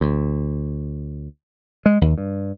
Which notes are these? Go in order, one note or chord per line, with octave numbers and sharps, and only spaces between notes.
D2
G#3
D#2
G2